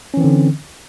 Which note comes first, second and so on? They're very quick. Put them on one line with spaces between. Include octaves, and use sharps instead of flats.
C#4 E3 C4 D3